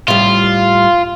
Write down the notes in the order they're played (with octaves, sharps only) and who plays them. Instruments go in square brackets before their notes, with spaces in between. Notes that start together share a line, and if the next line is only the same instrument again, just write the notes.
[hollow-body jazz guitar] A2 G3 [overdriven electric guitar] F4